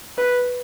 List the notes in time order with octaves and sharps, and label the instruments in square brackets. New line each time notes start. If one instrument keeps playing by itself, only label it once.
[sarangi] B4